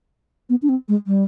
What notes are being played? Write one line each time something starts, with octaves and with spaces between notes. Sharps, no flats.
B3
D4
C4
G#3
G3